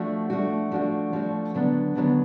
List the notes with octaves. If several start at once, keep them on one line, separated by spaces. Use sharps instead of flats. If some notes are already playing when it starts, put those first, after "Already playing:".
Already playing: F3 A3 D4 F#4
F3 A3 D4 F#4
F3 A3 D4 F#4
F3 A3 D4 F#4
D#2 D3 F#3 B3 D4
D#2 D3 F#3 B3 D4